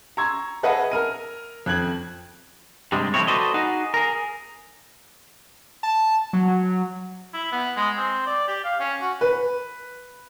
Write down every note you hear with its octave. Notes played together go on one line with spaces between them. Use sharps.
A#5 C6 C#6 E6 G#6
G#4 B4 D#5 E5 F#5 A5
A#4 F6 D#7
F2 F#6 G#6 F#7
G2 C3 G3 G#3
D3 F3 G#3 C4 E4 C#5
F#4 A4 B4 C5 D5 D#5
D#4 F#4 G#4
G#4 A#4
A5
F#3
E4
B3
G#3
C4
D5
G4
F5
C#4
F#4
B4